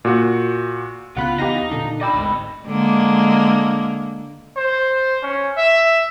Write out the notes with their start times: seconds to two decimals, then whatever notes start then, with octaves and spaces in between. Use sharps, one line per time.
0.05 A#2 F#4
1.17 C2 C#3 B3 F4 F#5 B5 F#6
1.39 E2 B3 D#4 G4 F5 A#6
1.71 A#2 D3 D4
2.01 D5 D#5 G5 B5 E6
2.13 G#1 D2 G#2
2.67 D3 G#3 A#3
4.57 C5
5.23 C#4
5.57 E5